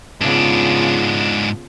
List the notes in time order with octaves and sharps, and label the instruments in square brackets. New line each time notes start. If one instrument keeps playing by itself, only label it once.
[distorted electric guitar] G#2 D4 [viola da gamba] C#3 B3 F4